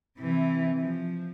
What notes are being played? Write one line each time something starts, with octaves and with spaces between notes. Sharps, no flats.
C3 E3
F3